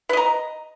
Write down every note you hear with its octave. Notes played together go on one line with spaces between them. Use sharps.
B4 D#5 A#5